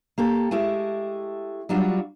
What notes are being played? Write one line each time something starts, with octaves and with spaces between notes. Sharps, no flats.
A#3 G4 A4
G#3 A3 E4 G4
F#3 G3 D4 F4 F#4